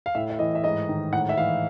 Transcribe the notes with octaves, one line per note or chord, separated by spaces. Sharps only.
F5
A2 E5
E5
E3 D#5
E5
G#2 D#5
D#3
A2 F#5
E5
E3 F5